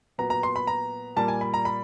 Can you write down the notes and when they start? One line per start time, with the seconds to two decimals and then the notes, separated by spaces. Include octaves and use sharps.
0.18 A#2 F#3 B3 A#5
0.30 A#5
0.43 C6
0.56 B5
0.67 A#5
1.16 A#2 G3 A#3 A5
1.28 G#5
1.41 B5
1.54 A#5
1.65 B5